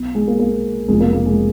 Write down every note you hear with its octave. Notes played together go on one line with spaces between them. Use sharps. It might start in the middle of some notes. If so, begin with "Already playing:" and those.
Already playing: B1 B2
G#3
A#3
A#3
F1 F2 C#3 F3 G#3
A#3
A#3
G#3